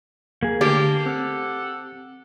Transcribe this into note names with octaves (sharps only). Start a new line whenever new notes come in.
A#3 G#4
D3 A3 A#3 G4 A5
C4 A4 F#5